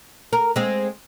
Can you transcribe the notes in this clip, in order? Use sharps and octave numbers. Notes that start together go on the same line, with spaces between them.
A#4
G#3 C4